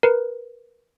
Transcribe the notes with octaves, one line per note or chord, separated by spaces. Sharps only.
A#4 B4